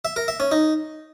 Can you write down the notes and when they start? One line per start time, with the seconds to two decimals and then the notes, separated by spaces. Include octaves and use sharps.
0.05 E5
0.16 A#4
0.28 E5
0.40 C#4
0.52 D#4